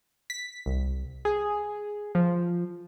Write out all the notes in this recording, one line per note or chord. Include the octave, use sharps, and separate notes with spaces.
B6
C2
G#4
F3